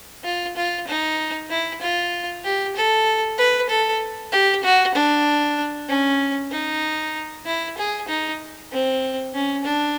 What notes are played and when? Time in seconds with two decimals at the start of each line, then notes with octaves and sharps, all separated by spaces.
0.24 F4
0.56 F4
0.88 D#4
1.50 E4
1.81 F4
2.44 G4
2.76 A4
3.38 B4
3.70 A4
4.32 G4
4.64 F#4
4.95 D4
5.89 C#4
6.51 D#4
7.46 E4
7.78 G#4
8.08 D#4
8.71 C4
9.34 C#4
9.65 D4